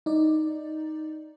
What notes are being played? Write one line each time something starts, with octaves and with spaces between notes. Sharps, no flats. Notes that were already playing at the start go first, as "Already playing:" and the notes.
D#4 D5